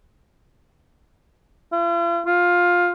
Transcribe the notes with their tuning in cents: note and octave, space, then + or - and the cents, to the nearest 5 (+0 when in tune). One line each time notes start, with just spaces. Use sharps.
F4 -45
F4 +15